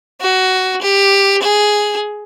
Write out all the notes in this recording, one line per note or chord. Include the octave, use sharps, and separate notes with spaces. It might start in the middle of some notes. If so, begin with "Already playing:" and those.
F#4
G4
G#4